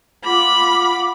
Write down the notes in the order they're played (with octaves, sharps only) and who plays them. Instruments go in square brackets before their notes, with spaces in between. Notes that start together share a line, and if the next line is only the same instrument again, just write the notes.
[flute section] F4 F#5 D6 [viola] B5